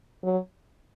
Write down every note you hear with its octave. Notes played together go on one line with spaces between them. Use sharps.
F#3